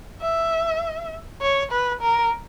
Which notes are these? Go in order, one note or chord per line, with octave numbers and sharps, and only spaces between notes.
E5
C#5
B4
A#4